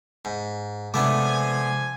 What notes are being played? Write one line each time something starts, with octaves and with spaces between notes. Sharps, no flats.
G#2
C3 F3 G#3 A3 B3 D4 G#5 D6